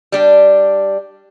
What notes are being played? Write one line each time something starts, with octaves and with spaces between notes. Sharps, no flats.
G3 D4 G4